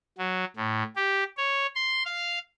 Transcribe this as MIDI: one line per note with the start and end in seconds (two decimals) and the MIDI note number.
0.18 0.45 54
0.57 0.83 45
0.96 1.24 67
1.37 1.67 73
1.75 2.03 84
2.05 2.39 77